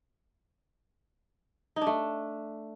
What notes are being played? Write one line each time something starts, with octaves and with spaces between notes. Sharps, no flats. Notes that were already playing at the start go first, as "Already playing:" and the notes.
D#4
D4
A3